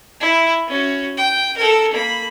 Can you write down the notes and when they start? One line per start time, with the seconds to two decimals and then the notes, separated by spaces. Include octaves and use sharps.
0.20 E4
0.68 C#4 F#4
1.17 G5
1.57 A4 A#4
1.93 A#3 B5